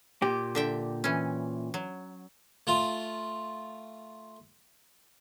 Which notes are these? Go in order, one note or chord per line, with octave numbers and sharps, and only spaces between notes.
A#2 G4
D3 E5 G5
E3 C#4
F#3
A3 F4